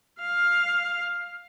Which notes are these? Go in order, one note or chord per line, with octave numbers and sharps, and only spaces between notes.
F5